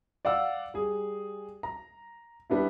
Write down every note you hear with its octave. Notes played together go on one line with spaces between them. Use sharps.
D5 F5 F#5 E6
G3 G#4
A#5
G3 B3 D4 E4